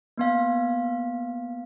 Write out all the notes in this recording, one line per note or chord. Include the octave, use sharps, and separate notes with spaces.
A#3 B3 F5